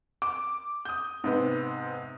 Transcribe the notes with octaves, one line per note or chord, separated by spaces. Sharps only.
D6
D#6 G6
G#2 C3 B3